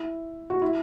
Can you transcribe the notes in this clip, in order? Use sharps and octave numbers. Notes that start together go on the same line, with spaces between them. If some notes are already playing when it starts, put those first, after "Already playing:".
Already playing: E4
F#4
E4